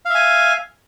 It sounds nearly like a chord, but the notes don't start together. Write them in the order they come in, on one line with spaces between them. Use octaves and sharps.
F5 E5 G#5